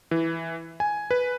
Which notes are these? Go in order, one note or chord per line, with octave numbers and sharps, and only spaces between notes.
E3
G#5
B4